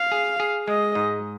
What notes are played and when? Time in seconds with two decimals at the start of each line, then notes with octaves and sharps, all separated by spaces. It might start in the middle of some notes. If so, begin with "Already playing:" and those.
Already playing: F5
0.12 G#4
0.40 G#4
0.68 G#3 D#5
0.95 G#2